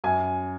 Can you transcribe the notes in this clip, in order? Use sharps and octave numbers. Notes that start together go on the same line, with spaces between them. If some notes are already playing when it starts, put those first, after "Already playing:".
F#2 G#5